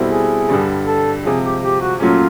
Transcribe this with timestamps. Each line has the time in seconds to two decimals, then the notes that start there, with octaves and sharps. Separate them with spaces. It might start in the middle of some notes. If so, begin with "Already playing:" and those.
Already playing: B2 G3 C4 E4 A4
0.10 G#4
0.49 G2 D3 G3
0.86 A4
1.24 C3 F3 G#3 G#4
1.44 G4
1.63 G4
1.81 F#4
2.00 A#2 F#3 A3 C#4 F4